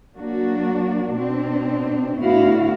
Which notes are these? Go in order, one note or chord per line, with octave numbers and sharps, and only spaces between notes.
F#3 A#3 D4 F#4
B2 C4 D4
A2 D3 B3 E4 F#4 F5